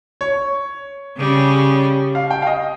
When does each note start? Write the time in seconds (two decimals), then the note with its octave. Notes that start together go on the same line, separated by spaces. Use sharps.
0.21 C#5
1.18 C#3 G3 C#4
2.15 F5
2.31 G5
2.42 F5
2.47 D#5